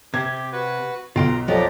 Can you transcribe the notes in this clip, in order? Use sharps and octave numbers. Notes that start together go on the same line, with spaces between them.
C3 G4 G#6
F#4 B4
B1 F4 G5 A#5 C6
F2 F3 F#3 F#4 G4 D5 D#5 A#5